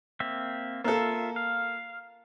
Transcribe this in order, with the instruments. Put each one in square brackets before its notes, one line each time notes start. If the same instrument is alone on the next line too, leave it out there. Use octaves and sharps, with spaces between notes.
[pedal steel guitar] A#3 C4 E5
[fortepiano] A#3 A4 [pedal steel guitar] F4 E5
[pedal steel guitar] F5